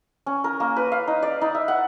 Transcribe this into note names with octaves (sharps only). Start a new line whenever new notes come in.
C#4
A#4
A#3
B4
F5
D#4
D5
D#4
E5
F#5